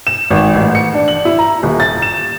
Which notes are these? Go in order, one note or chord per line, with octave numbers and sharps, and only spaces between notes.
E7
G#1
A1
C#7
D4
F#7
E4
A#5
D#1
A6
E7